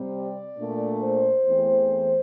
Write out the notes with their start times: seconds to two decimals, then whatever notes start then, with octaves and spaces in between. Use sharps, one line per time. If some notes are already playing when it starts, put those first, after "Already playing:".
Already playing: C3 G3 C4
0.15 D5
0.59 A#2 A3 D4
1.01 C5
1.45 E2 E3 A3 C4